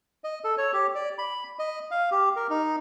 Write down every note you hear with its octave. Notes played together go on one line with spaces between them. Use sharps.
D#5
A4
C#5
G4
D5
B5
D#5
F5
G4
A#4
D#4